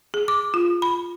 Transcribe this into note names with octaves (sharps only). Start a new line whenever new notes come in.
G#4
D6
F4
B5